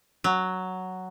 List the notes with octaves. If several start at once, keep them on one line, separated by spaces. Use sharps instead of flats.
F#3